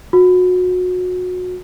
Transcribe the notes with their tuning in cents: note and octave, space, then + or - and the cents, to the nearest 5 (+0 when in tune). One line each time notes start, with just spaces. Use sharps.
F#4 -30